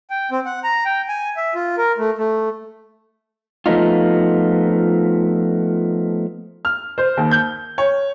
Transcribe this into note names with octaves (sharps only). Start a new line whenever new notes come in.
G5
C4
F#5
A#5
G5
G#5
E5
F4
A#4
A3
A3
F3 A3 B3 D#4 F4
F6
C5
D#2
G6
C#5